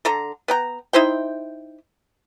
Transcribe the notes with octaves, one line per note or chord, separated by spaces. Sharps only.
D3 A4 A#5
B3 G5 A#5
D#4 E4 C5 G5